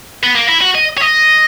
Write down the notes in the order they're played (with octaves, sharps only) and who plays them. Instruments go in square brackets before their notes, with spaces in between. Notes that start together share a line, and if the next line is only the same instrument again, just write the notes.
[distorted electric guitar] B3
A#3
E4
F#4
D#5
C#5
D#5